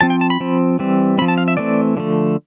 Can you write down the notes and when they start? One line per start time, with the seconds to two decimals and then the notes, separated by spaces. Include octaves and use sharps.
0.01 F3 C4 A5
0.10 G5
0.21 A5
0.30 B5
0.40 F3 C4
0.79 E3 G3 C4
1.18 C4 B5
1.22 F3
1.28 A5
1.38 F5
1.48 E5
1.57 E3 A3 C4 D5
1.97 D3 F3 A3